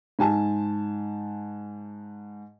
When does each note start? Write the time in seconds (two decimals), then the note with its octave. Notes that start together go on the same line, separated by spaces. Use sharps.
0.19 G#2 G#5 A5